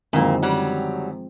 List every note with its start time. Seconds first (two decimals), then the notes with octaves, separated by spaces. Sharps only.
0.13 F#2 A#2 D3 D#3 F3 G#3 A#3 C4
0.43 F#3 G3